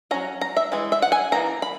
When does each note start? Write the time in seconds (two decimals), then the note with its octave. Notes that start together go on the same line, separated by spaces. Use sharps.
0.11 C#4 A#5
0.14 F#3
0.41 A#5
0.57 E5
0.72 E3 G#3
0.92 E5
1.02 F#5
1.12 G#5
1.32 E3 A#3 D#4 A#5
1.62 B5